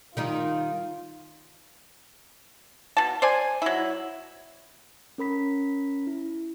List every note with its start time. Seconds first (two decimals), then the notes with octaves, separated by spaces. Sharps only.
0.17 D#3 G3 D#4 F4
2.97 B2 A5
3.22 C5 D5 G#5
3.62 F#3 E4
5.18 C#4 A#4 B5 B6
6.07 E4